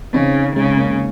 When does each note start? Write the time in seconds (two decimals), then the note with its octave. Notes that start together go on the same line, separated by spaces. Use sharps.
0.14 C#3 C4 D#4
0.56 C#3 G#3 C4
0.77 A#3